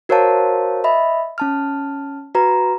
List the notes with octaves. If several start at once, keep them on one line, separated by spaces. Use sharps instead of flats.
F#4 A#4 C5 C#5 F5 A5
D#5 E5 B5
C#4 A5 F6
F#4 B4 A#5